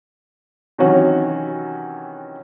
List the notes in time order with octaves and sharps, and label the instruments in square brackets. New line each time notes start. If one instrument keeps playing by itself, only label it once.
[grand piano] C3 D#3 E3 F#3 C#4 F#4